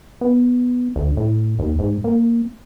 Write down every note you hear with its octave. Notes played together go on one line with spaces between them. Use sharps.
B3
D2
A2
D#2
G#2
A#3